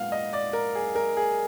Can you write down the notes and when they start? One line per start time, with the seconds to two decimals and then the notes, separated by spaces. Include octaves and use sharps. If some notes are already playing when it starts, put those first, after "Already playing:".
Already playing: A#2 G#3 B3 F5 F#5
0.12 D#5
0.33 D5
0.53 A#4
0.75 G#4
0.96 A#4
1.17 G#4